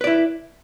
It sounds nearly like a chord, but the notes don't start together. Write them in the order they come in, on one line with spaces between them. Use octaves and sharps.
B4 D5 E4